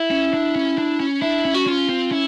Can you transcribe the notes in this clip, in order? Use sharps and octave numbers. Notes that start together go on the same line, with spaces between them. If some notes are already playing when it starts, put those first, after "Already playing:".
Already playing: E4
C#4
D4
C#4
D4
C#4
D4 E4
C#4
F#4
C#4 F4
C4
C#4 E4